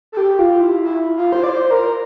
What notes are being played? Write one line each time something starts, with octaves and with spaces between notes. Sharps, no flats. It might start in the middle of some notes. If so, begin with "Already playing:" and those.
A4
G4
F4
E4
E4
F4
C5
D5
C5
A#4